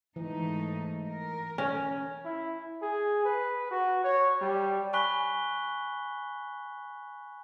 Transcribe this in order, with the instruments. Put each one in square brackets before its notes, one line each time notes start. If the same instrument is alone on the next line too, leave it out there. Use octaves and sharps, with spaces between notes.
[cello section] G#2 A3 D#4 [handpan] E3
[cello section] A#4
[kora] C#4
[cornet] E4
G#4
B4
F#4
C#5
G3
[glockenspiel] G#5 B5 C#6 F#6 B6 G7